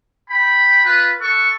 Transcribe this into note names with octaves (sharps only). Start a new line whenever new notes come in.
G5 B5
F4 B4
A4 F#5 C#6